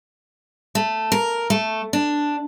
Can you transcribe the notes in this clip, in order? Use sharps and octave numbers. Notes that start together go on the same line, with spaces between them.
A3
A#4
A3
D4